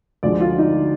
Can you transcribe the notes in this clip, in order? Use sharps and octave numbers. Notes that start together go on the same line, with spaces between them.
D2 D3 F3 G#3 D5
F4
D#4